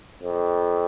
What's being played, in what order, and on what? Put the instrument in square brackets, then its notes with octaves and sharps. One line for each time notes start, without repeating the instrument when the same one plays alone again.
[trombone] F2